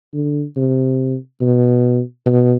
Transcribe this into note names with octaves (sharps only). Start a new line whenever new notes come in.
D3
C3
B2
B2